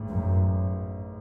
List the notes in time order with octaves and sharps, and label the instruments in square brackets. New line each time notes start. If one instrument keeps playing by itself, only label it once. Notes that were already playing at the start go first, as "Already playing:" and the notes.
Already playing: [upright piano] A1 G#2
[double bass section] F#2